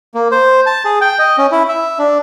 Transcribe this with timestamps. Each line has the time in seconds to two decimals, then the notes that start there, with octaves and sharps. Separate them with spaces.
0.15 A#3
0.32 C5
0.66 A5
0.85 G#4
1.01 G5
1.19 D#5
1.38 C#4
1.52 E4
1.69 E5
1.99 D4